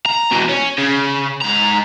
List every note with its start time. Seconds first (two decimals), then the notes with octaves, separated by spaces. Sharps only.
0.06 A#5
0.31 E2 B2
0.49 C#4
0.78 C#3
1.41 G#2 A#5